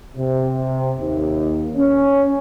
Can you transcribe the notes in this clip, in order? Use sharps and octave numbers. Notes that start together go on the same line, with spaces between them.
C3
D#2
C#4